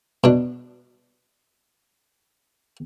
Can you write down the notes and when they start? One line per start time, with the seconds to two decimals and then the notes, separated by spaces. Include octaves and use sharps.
0.24 B2 D4